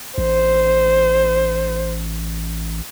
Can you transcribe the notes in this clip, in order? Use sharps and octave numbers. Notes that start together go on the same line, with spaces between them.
A1 C5